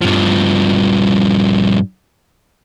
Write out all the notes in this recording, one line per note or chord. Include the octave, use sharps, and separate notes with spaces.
G2 F3